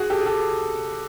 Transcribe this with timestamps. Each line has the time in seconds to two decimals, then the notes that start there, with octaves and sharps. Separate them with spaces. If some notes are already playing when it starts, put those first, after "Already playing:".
Already playing: F#4 G#4
0.10 G4 A4
0.21 G#4
0.26 G4 A4